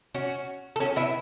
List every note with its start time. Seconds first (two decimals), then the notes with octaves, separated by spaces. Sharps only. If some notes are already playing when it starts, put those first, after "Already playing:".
0.14 C#4 F#4
0.76 A4
0.80 C#4 F#4
0.96 B3 E4